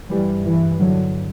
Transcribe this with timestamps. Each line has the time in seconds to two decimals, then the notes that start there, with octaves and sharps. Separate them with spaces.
0.10 G2 E3 G3
0.44 E3
0.79 D3 F#3